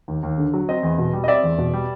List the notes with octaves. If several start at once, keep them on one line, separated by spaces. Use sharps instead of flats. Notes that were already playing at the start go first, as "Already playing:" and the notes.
D#2
D#2
D3
F#3
C4 D#5
E2
B2
G3
D#5
C4 D5 E5
E2
B2
G3